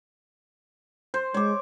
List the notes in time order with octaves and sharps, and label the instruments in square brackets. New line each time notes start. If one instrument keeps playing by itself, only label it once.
[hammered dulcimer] C5
[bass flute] G#3 [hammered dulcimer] C#5 D6